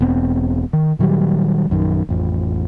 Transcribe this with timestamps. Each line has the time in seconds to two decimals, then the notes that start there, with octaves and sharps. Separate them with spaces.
0.01 E1 B3 C4
0.73 D#3
0.99 A#2 D#3 F#3 G3
1.70 A#1 F#2 D#3
2.09 A1 F2 F3